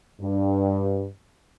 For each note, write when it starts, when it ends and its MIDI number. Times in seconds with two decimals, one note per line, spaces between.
0.21 1.08 43